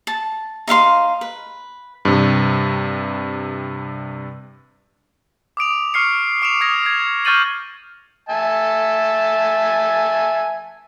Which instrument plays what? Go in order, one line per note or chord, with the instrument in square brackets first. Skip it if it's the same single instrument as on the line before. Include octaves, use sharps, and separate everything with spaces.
[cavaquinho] A5
D#4 E5 F5 C6
B4
[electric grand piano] G2 C3
[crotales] D6 D#6 D7 F7
C#6 F6 C7 C#7
D6 D7 E7 F7
D#6 G#6 A#6 F7
G#6 D7
C#6 F6 G6 A6 D#7 F#7
[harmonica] E5 G#5 A5